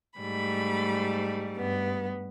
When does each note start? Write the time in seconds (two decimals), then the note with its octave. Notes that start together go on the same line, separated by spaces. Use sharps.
0.19 G#2 G3 A3 B5
1.56 G2 B3